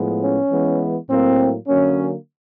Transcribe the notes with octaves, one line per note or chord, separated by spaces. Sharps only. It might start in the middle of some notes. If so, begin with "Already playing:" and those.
Already playing: A2 F3 G#3 B3
C#4
E3 G#3 B3
A2 F#3 A#3 C4
D3 F#3 A#3 C#4